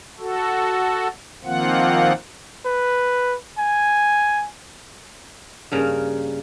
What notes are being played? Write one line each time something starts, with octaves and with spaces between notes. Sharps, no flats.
F#4 A4
D#3 F3 A#3 C4 F4 F#5
B4
G#5
G2 C#3 A#3 A#4